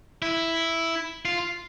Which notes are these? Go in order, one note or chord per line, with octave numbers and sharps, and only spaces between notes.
E4
F4